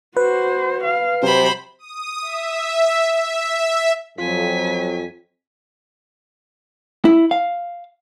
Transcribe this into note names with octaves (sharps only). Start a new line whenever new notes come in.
F#4 B4 C5
F5
C3 F#3 C5 B5
D#6
E5
E5
F2 F#3 F4 G#5 B6
E4
F5